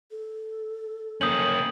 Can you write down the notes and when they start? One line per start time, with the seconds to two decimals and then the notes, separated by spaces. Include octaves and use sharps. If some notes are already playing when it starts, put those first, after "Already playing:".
0.11 A4
1.21 A#3 C#4 D#6 G6 F#7